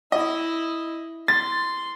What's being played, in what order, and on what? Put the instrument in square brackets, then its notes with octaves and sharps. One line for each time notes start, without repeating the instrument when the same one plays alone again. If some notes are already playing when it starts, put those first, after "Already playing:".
[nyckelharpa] E4 [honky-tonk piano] D#5
[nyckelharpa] C6 [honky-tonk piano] A6